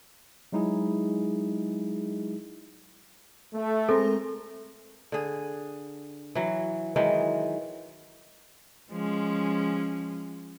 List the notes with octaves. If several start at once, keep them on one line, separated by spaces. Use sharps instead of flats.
F#3 G#3 D#4 E4 G#4
A3
G#3 C4 A4 A#4
D3 G#4
E3 F#3
D#3 E3 F#3 G#3
F3 G#3 C#4